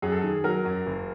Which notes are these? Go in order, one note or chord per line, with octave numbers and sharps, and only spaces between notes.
F#2 G#4
A4
D#3 G#4
F#3 A#4
F#2
F#1